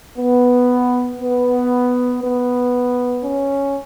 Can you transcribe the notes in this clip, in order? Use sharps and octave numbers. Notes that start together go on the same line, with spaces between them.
B3
B3
B3
C#4